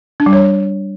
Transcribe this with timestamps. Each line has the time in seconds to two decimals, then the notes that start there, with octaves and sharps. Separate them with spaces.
0.20 D4
0.26 G3
0.33 C#5